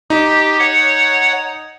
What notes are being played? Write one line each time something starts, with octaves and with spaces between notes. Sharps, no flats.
D#4 G4
C#5 F#5